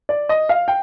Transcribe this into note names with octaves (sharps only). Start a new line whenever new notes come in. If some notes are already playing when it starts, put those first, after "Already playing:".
D5
D#5
F5
G5